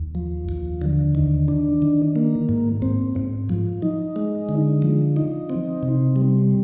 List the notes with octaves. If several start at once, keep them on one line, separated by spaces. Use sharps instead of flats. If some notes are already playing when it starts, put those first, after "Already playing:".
Already playing: D#2
F3
D#2
D3
D#3
D4
D#3
A#3
G#2
C4
G#2
F3
D#4
G#3
D3
F3
D#4
C4
C3
G3